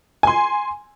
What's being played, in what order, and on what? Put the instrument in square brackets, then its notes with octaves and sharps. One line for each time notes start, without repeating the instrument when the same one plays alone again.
[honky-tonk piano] G#5 C6